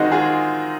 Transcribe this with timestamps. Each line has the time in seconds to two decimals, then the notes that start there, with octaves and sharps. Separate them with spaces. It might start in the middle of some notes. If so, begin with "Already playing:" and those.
Already playing: D#3 G#3 C4 D#4 F#4
0.12 F4 G#4